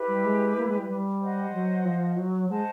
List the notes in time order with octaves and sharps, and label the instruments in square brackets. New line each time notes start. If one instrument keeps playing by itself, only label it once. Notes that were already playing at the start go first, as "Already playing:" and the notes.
Already playing: [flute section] E4 G4 B4
[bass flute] G3
G#3
A#3
G#3
G3
G3
[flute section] C5 D#5 F#5
[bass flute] F#3
F3
F#3
[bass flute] G#3 [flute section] C5 D#5 F#5 A5